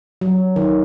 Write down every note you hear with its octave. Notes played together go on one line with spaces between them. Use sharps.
F#3
D#3